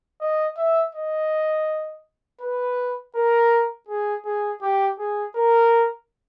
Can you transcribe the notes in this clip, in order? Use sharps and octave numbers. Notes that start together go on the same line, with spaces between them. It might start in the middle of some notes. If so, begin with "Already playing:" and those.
D#5
E5
D#5
B4
A#4
G#4
G#4
G4
G#4
A#4